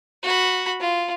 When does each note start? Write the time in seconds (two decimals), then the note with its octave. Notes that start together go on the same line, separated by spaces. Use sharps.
0.23 F#4 B5
0.80 F4